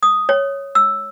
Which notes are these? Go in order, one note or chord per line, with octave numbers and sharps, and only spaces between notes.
D#6
C#5
E6